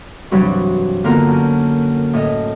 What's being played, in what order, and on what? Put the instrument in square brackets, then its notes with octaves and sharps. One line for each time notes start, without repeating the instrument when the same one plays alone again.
[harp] G2 C3 E3 F#3 G3 F#4
D3 A#3 B3 F4 A#4
F#2
A2 D#5